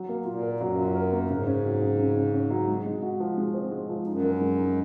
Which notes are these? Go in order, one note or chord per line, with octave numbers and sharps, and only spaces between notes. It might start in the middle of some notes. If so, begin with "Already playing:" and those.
Already playing: F#3
A#3
A#2 F4
A#4
F#2 F#3
F4
A#4
A#3
G#2 C#3
C#4
F#3
C#3
C#3
C#4
C#4
F#3
G#3
G#3
F#4
F3
G#3
C4
G#3
F3
F#2 D#4
A#4
G#3
D#4